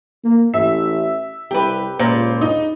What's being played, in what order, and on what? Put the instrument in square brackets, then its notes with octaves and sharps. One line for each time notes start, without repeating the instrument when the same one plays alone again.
[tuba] A#3
[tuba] A1 [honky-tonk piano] E5
[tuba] C2 [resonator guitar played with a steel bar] G4 B4
[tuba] C#2 [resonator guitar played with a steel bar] A#2 [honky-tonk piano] C5
[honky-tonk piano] D#4